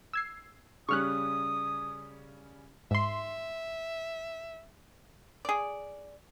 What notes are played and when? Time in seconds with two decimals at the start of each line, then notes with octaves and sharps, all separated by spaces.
0.13 E6 G#6 C7
0.89 C#3 G3 C#4 C#6 D#6 F6 F#6
2.91 G#2 E5 C6
5.45 G#4 D5